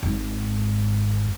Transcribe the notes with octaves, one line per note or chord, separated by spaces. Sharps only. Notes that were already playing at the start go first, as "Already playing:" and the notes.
G#1 G#2